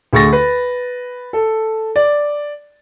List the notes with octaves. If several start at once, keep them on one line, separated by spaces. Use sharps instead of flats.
D2 G#4 C#6 A6 A#6
B4
A4
D5